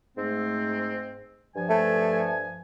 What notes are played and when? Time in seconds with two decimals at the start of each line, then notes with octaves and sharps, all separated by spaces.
0.16 G#2 A3 C4
1.56 G2 F3 G#5
1.70 A3